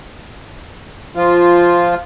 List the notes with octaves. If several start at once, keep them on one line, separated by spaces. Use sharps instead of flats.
F3 F4